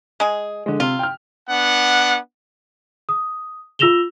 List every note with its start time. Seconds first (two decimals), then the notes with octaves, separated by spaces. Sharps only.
0.20 G#3 G#4
0.66 D3 G#3
0.80 C3 F4
0.99 G5 F6
1.50 B3 D4 F#5
3.09 D#6
3.79 F4 E6 A#6 E7 F7 G7